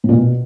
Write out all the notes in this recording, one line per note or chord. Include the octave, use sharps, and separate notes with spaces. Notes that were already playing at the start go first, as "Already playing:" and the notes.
A2
A#2
B2